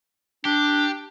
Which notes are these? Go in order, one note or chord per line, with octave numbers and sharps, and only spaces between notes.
D4 G4